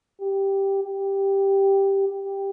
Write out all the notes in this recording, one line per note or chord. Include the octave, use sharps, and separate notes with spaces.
G4
G4
G4